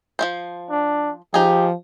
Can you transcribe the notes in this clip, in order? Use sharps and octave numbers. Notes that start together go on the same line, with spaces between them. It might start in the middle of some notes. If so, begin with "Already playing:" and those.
F3 A3 C5
D4
F3 D#4 G4 G#4